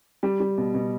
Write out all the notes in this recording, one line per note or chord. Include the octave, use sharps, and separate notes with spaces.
G3
G3
B2
B2